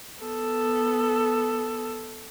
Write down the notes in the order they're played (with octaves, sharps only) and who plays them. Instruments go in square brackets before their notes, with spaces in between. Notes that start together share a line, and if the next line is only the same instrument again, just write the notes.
[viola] B3 A4